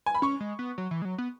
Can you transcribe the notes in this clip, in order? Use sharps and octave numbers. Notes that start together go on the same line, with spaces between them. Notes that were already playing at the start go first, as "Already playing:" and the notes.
G#5
B5
C#4 C#6
G#3
B3
F#3
E3
G#3
F#3
B3